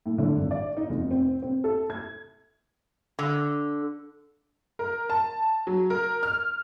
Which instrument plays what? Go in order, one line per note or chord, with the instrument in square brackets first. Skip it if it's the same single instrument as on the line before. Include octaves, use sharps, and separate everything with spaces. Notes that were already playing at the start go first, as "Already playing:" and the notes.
[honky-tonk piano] A2
D3
G#1
D5
D#4
F1
C4
C4
A4
G#6
[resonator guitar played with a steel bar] D3
[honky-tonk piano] A#4
A5
F#3
A#4
F6